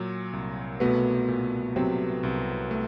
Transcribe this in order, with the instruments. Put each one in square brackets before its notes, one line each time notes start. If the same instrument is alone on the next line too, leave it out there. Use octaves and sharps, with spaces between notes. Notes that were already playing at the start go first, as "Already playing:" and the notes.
Already playing: [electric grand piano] A#2 F#3
C2
[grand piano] B2 B3 [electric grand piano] A3
[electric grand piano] A#2
[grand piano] C3 C4 [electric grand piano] F#3
[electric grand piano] C2
A3